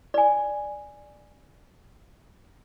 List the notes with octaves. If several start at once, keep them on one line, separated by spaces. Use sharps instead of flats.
D5 G#5